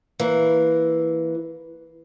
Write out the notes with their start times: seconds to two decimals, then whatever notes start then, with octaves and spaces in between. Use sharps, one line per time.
0.19 E3 A#3